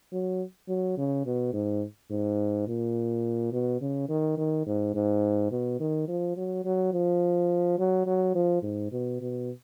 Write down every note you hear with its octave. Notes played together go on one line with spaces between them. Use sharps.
F#3
F#3
C#3
B2
G#2
G#2
A#2
B2
C#3
D#3
D#3
G#2
G#2
B2
D#3
F3
F#3
F#3
F3
F#3
F#3
F3
G#2
B2
B2